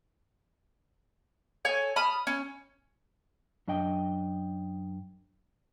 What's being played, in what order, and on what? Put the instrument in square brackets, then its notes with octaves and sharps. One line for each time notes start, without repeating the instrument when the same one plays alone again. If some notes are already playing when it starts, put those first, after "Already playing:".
[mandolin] A4 C#5 G#5
A5 B5 D#6 F6
C#4
[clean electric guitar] F#2 D4 D#5 G5